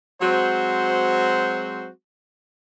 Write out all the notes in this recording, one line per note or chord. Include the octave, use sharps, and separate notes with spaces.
F#3 G#3 C4 F#4 C5